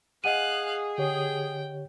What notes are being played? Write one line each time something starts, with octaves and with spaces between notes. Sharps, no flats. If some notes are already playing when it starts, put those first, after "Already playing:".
G#4 D#5 F5 F#5 F#6 D#7
D3 G4 C#5 G5